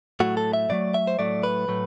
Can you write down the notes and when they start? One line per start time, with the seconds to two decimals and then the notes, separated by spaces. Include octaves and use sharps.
0.20 A2 F#3 A3 F#4
0.37 A4
0.53 E5
0.69 A2 F#3 A3 D5
0.94 E5
1.07 C5
1.19 A2 F#3 A3 D5
1.43 B4
1.68 A2 F#3 A3